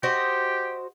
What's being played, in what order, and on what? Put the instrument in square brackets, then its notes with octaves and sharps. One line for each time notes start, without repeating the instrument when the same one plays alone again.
[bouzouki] F#4 C5 D#5 [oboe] G4